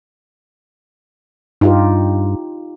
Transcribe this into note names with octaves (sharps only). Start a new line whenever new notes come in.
G2 D#4 F4 G4